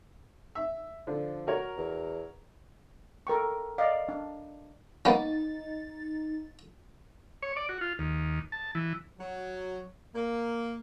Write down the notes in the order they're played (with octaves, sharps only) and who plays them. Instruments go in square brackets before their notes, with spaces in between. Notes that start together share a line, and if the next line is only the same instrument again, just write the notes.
[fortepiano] E5
[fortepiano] D3 [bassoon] F3
[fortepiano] F#4 A#4 C#5
[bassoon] E2
[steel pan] A4 A#4 G5 C#6
D5 D#5 F5
D4
[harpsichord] A#3 B3 C#4 [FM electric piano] D#4 A6
[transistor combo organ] C#5
D5
F#4
F4
D#2
A5
E3
[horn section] F#3
A#3